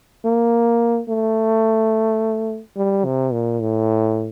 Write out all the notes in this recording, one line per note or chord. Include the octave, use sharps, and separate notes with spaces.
A#3
A3
G3
C3
A#2
A2